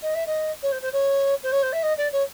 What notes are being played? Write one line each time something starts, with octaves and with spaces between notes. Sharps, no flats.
D#5
E5
D#5
C#5
C5
C5
C#5
C5
C#5
C5
E5
D#5
D5
C#5